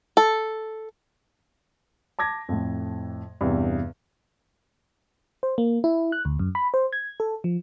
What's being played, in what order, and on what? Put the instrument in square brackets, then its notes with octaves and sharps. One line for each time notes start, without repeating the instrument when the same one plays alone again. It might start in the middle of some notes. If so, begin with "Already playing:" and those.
[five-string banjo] A4
[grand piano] A5 D6 G#6 A#6
F2 A2
E2 G2 C3
[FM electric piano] C5
A#3
E4
F#6
D2
F#2
B5
C5
G#6
A4
F3